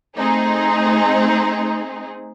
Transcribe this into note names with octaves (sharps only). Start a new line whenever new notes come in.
A3 C4 D#4 G#4